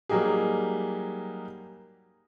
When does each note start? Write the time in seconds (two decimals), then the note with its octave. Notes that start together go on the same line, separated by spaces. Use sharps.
0.09 F#3 G3 A#3 D#4 G4 G#4